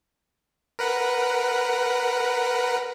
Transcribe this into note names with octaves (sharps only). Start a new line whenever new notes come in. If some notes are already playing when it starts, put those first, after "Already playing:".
A#4 B4 F#5